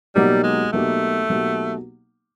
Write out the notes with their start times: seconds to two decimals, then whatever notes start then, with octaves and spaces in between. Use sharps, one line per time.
0.15 B2 F#3 G3 A#3 D#4 G4
0.44 G#3
0.72 B2 F#3 A3 A#3 D#4 G4
1.29 B2 F#3 A#3 D#4 G4